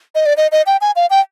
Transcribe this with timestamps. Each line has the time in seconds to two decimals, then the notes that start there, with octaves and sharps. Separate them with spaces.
0.15 D#5
0.26 D5
0.37 D#5
0.52 D#5
0.66 G5
0.81 G#5
0.96 F5
1.10 G5